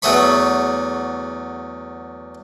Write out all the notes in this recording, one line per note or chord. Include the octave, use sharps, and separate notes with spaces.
E2 F#3 A3 G#4 C#5 B5